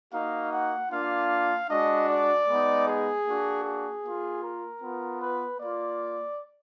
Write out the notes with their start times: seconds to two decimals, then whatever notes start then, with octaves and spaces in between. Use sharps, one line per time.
0.14 A#3 D#4 F#4 F5
0.53 F#5
0.92 A#3 D4 F4 F5
1.70 G#3 D4 F#4 D#5
2.09 D5
2.48 G#3 B3 D#4
2.87 G#4
3.26 A#3 D4 F#4
3.65 G#4
4.04 A#3 F4
4.43 A#4
4.83 B3 F4
5.21 B4
5.60 A#3 F4 D5